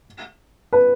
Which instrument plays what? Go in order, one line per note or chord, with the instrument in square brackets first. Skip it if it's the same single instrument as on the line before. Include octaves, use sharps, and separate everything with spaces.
[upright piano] B4